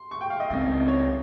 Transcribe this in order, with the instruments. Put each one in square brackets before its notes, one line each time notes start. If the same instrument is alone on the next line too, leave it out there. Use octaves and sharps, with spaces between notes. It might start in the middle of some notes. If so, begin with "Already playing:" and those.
Already playing: [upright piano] C6
C#6
G5
F5
D#5
[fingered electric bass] C#2 C#3 F3 C4 [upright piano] D#5
[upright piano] C#5